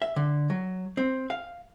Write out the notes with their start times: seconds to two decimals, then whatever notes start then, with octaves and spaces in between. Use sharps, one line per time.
0.02 E5
0.16 D3
0.50 F#3
0.97 C4
1.30 F5